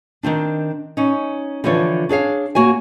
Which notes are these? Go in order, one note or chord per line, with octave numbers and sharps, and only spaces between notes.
D#3 A#3 C4 D4
C#4 D#4
D3 E3 F3 D4 F4 C#5
D4 G#4 C#5 F5
A#3 F#4 C#5 G#5